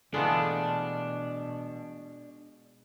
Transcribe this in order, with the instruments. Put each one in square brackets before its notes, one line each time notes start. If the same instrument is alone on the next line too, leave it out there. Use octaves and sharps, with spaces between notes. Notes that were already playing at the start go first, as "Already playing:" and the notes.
[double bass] B2 [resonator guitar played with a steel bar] E3 A3 A4 [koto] G#3 B3 F4 [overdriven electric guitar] D4